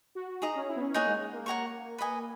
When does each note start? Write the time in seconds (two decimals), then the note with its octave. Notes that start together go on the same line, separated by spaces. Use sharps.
0.15 F#4
0.42 D#4 G#4 D#5 A#5 D#6
0.55 C#4
0.68 E4
0.76 B3
0.81 C#4
0.94 A#3 D#4 G#4 C#5 F#5
1.07 G#3
1.21 G#3
1.33 A#3
1.46 C#5 F#5 A#5 C#6
1.98 B4 D#5 G#5